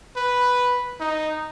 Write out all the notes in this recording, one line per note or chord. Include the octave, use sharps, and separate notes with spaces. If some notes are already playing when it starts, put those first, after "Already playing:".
B4
D#4